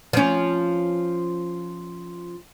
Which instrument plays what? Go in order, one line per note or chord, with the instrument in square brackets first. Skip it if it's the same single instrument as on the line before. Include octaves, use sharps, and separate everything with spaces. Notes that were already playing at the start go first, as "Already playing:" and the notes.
[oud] F3 C#4